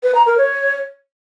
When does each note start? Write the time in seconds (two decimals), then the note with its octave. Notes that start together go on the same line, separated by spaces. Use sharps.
0.03 B4
0.14 A#5
0.26 A#4
0.37 C#5